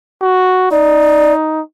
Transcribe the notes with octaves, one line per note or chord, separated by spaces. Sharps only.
F#4
D#4 D5